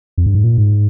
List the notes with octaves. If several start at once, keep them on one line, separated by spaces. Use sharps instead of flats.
F2
G2
G#2
A#2
G#2